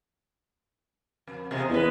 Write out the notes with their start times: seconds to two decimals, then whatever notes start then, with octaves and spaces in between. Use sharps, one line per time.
1.27 F2
1.51 E2 C3 G#3
1.69 E2 G#3 D4 B4